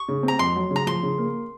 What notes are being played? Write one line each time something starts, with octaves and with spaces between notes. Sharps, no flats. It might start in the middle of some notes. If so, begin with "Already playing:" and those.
Already playing: C#6
C#3
C4
A#5
F2 C6
F#3
C#3
A#5
F3 C6
C#3
A#3